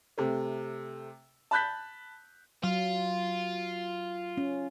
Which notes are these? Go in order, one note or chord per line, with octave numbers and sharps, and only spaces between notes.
C3 A3
A5 B5 F#6 G6 B6
F#3 F4
C#4